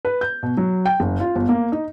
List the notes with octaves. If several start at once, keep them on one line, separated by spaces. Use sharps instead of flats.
B4
G6
B2
F#3
G5
F#1
F4
G1
A#3
D#4